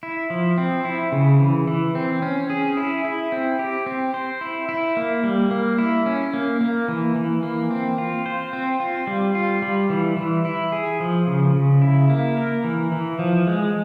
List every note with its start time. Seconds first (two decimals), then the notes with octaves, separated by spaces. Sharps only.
0.03 E4
0.30 F3
0.58 C4
0.85 E4
1.12 C#3
1.40 E3
1.68 E3
1.95 C4
2.22 C#4
2.50 G#4
2.77 E4
3.04 E4
3.32 C4
3.59 G4
3.86 C4
4.14 C5
4.41 E4
4.69 E4
4.97 A#3
5.24 G3
5.51 A#3
5.78 E4
6.06 C#4
6.34 A#3
6.61 A#3
6.88 E3
7.16 E3
7.43 A#3
7.71 C4
7.98 F4
8.26 C5
8.53 C4
8.80 F4
9.07 G3
9.35 F4
9.62 G3
9.90 E3
10.17 E3
10.45 E4
10.72 G#4
11.00 F3
11.27 C#3
11.55 C#3
11.82 E4
12.10 A#3
12.37 A#4
12.64 E3
12.92 E3
13.19 F3
13.47 G#3